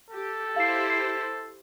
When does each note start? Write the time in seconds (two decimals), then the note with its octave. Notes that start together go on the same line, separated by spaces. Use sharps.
0.10 G4 A4
0.56 E4 G4 C5 F5 C7
0.90 C7